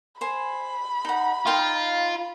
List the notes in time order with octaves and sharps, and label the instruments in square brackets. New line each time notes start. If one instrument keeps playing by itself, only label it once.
[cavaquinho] C5 G#5 [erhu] B5
[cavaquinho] D#4 F#5
[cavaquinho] D#4 F5 G5 [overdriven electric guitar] F4